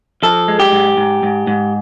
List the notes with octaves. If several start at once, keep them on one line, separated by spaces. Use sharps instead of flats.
F3 A4
G#3
G4
G#2
G#2
G#2
G#2